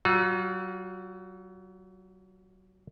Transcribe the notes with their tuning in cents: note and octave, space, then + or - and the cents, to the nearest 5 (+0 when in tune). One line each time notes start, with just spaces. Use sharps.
F#3 +35 F#4 -45